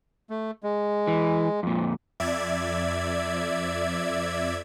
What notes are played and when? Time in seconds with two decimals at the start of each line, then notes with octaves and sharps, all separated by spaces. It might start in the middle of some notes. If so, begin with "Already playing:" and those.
0.30 A3
0.63 G#3
1.07 E3
1.63 F2 A#2
2.20 F2 D5 E5 G#6